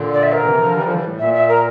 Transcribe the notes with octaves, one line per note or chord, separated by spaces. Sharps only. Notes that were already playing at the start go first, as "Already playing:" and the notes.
Already playing: A#2 D3
D5
E5
A#4
C3 E3
E3
D3 F3
E3 G3
D3 F3
E3 G3
A2
A#2 E5
E5
A#4